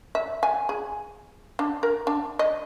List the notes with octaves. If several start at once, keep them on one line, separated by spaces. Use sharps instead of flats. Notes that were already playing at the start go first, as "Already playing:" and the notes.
E5
G#5
G#4
D4
A#4
D4
D#5